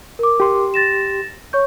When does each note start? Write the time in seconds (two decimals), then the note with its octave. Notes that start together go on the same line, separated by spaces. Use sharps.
0.19 A#4 D6
0.40 G4 C6
0.74 A6 A#6 E7
1.53 C#5 C#6 G6